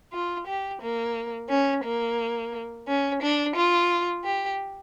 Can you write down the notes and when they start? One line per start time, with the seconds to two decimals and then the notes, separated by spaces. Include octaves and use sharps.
0.13 F4
0.47 G4
0.81 A#3
1.49 C#4
1.84 A#3
2.88 C#4
3.22 D4
3.56 F4
4.24 G4